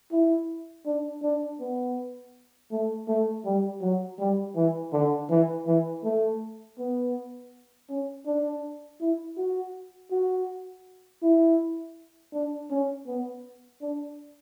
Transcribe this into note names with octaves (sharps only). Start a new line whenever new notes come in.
E4
D4
D4
B3
A3
A3
G3
F#3
G3
E3
D3
E3
E3
A3
B3
C#4
D4
E4
F#4
F#4
E4
D4
C#4
B3
D4